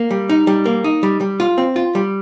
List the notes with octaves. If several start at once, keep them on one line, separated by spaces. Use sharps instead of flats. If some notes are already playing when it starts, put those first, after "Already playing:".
Already playing: A#3
G3
D#4
G3
A#3
D#4
G3
G3
F4
C4
F4
G3